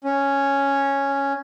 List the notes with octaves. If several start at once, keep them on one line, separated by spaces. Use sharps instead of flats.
C#4